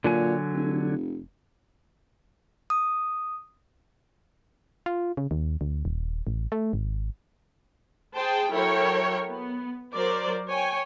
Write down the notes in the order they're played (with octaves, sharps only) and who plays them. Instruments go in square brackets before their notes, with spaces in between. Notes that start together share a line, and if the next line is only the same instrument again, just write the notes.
[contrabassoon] A#2 [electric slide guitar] D3 F#3 G#5
[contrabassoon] F1
[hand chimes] D#6
[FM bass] F4
C#3
D#2
D2
D#1
A1
A3
G#1
[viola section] G#4 C5 G5 A5
F#3 E4 A4 A#4 C#5 G5
B3
F#3 A#4 C5 D5
C#5 G5 G#5